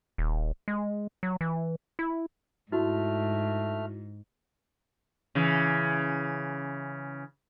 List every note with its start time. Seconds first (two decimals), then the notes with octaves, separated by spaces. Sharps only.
0.18 D#1
0.68 G#3
1.23 F#3
1.41 E3
1.99 E4
2.72 G#2 A3 E4 F#4 F6
5.35 C#3 E3